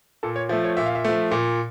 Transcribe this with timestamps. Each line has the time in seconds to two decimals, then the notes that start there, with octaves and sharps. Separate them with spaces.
0.23 A#2 A4
0.36 C#5
0.49 F3 A3 E5
0.64 C#5
0.77 A#2 E5
0.86 F5
0.95 E5
1.04 F3 A3
1.31 A#2